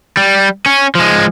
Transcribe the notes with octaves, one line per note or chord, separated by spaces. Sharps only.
G3
C#4
F3 G#3